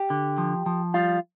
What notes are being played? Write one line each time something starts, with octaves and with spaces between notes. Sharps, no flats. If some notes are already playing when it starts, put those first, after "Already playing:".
Already playing: G4
D3
F3
F3
G3 F4